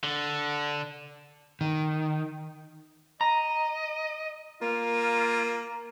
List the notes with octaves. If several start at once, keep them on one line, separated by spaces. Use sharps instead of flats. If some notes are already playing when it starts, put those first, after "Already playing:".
D3
D#3
D#5 A#5
A#3 F4